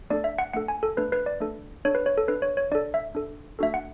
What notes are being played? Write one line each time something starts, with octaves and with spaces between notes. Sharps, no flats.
A3 D4 A4 D5
E5
F#5
A3 D4 A4 F#5
G#5
A4
A3 D4 A4 B4
B4
D5
A3 D4 A4
D4 A4 C#5
B4
C#5
A4
D4 A4 B4
C#5
C#5
D4 A4 D5
E5
D4 A4
A3 D4 F#4 A4 E5
F#5